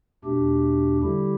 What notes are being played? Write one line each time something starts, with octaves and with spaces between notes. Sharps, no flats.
E2 B2 A3 D4 G4
D3 G3 E4 G4